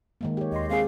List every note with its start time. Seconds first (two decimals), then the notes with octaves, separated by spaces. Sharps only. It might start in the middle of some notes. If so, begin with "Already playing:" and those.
0.21 D#3 G#3 A#3
0.37 G4 C#5
0.52 D#2 D#5 C6
0.69 G#3 C4 G#4 F5